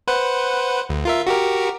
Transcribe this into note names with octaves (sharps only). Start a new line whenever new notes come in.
B4 C5 F#5
D2
F4 A#4 E5
F#4 G4 A#4